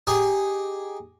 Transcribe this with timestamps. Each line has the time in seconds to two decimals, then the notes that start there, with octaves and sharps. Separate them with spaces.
0.07 D#4 G4 G#4 D#5 G#5